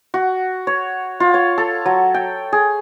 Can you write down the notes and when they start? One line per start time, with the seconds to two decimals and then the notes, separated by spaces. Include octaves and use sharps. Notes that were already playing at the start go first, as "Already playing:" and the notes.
0.14 F#4
0.67 C#5
1.20 F4
1.34 C#5
1.58 A4
1.86 F#3
2.14 G5
2.52 G#4